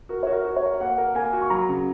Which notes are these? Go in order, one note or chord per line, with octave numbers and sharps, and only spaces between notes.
F#4 A#4
F#4 C#5
A#4
F#4
C#5
A#4
A#3 F#5
A#4
A#3 G#5
F#4
C#6
F#3 A#5
C#3